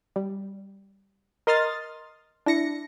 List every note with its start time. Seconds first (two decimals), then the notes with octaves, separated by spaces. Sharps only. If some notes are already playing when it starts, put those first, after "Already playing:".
0.16 G3
1.47 A#4 D#5 C6 D#6 F6 A6
2.46 D4 E4 A#6 C#7